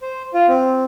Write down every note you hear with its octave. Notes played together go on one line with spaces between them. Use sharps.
C5
F4
C4